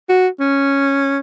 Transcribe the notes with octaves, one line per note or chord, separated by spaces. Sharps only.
F#4
C#4